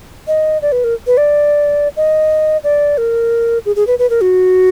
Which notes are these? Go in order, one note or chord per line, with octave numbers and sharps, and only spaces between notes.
D#5
D5
B4
A#4
B4
D5
D#5
D5
A#4
G#4
G#4
B4
B4
A#4
F#4